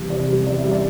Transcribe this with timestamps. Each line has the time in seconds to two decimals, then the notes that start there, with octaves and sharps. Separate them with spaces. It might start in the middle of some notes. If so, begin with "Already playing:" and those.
Already playing: E2 C3 G3
0.10 C3 D5
0.29 G3
0.46 E2 D5
0.58 E5
0.64 G3
0.71 D5